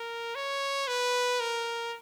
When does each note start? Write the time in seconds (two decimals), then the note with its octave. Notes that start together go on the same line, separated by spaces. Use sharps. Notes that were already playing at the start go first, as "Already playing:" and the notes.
Already playing: A#4
0.35 C#5
0.88 B4
1.40 A#4